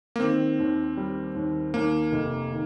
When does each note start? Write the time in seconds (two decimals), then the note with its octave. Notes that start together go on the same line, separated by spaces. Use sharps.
0.16 A#3
0.20 D#3 C4
0.59 D#2
0.97 G3
1.35 D#2
1.74 D#2 A#3
2.12 F1
2.51 D#3